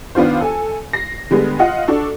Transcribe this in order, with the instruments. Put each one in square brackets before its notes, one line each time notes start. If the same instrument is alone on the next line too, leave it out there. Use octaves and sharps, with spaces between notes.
[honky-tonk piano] D#3 B3 D4 F4 C5
A4 G#5
A#6 C7
D3 G3 G#3 B3
F4 D#5 F#5
D4 F#4 A4